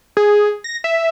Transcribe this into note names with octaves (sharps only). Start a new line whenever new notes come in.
G#4
A#6
E5